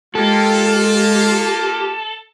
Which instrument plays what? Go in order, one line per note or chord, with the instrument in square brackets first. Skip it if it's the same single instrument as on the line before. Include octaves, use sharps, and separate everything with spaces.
[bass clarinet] G#3 [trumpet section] A#3 F4 [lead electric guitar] G4 [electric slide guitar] A4